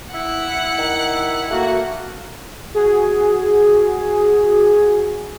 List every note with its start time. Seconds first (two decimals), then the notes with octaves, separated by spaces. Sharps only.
0.14 E4 F#5
0.78 D#3
1.51 A3 A#3 F#4
2.74 F#4 G#4